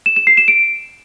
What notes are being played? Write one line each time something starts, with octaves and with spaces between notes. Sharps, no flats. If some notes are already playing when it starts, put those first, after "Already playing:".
E7
E7
C7
E7
D7